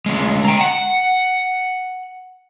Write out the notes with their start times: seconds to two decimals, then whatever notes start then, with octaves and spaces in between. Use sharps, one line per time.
0.06 D2 G#3
0.45 G5 A#5
0.61 F#5